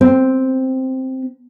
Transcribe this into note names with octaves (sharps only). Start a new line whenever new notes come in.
C4